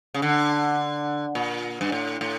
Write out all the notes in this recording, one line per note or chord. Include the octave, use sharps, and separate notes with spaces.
C#3
D3
A#2
G2
A2
A2